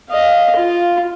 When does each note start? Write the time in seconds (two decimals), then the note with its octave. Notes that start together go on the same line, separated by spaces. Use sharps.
0.10 D#5 F5
0.56 F4